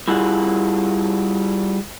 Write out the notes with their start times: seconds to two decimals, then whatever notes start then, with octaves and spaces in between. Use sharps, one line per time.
0.08 G3 E4 F4 G#4 F#5